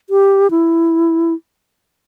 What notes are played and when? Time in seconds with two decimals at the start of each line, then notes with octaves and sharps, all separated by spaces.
0.10 G4
0.51 E4